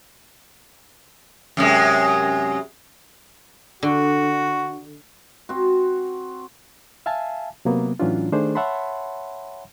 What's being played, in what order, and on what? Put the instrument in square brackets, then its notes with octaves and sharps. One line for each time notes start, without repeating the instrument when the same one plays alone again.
[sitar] F#2 C3 G#3
[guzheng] D3 [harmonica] F#4
[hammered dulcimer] C4 F#4
[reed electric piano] E5 F5 G#5 A5
C3 F#3 A#3 B3
A2 E3 F#3 C#4 D4 F4
D#3 A3 D4 G#4 C5
C#5 E5 F#5 A5 B5 C6